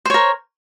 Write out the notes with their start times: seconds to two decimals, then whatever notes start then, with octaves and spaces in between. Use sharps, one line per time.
0.05 C5
0.10 C#5
0.14 A#4